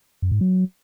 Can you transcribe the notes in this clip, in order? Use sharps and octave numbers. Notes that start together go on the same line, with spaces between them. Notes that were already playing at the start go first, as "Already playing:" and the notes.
F#2
G#2
F#3